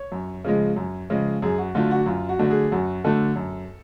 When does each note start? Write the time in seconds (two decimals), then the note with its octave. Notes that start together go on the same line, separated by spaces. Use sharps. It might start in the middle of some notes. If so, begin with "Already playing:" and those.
Already playing: C#5
0.12 F#2
0.45 C#3 F3 G#3
0.76 F#2
1.10 C#3 F3 G#3
1.42 F#2 G#4
1.58 F#4
1.75 D3 F#3 A3 D4 F4
1.91 F#4
2.06 F#2 F4
2.29 F#4
2.39 D3 F#3 A3 D4
2.51 G#4
2.71 F#2 F#4
3.04 D3 F#3 A3 D4 A4
3.36 F#2